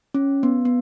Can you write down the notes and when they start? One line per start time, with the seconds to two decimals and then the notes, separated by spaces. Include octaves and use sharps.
0.14 C#4
0.43 B3
0.65 B3